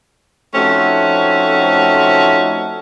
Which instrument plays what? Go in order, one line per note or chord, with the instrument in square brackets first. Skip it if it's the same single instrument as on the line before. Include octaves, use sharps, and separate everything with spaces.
[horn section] F3 A3 C4 C#4 D#4 F#4